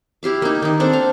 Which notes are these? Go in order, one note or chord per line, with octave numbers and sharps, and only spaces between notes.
E4 G4 F5 D6
A#3 D#4
D#3 D#4
C4 D4 A4 D6
F5